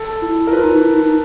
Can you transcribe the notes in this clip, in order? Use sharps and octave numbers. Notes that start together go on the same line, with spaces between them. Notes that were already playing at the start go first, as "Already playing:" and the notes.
Already playing: A4
E4
A#4
F4 B4
D#4
E4
E4
D#4